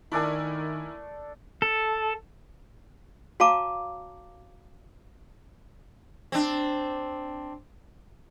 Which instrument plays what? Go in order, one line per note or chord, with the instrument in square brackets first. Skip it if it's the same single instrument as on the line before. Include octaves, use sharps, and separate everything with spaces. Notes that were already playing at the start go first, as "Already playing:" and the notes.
[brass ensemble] D#3 [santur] A3 D4 A4 [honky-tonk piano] E4 A#4 G#5
[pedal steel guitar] A4
[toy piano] F#4 C#5 F5 A5 A#5 D6
[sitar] C4 D4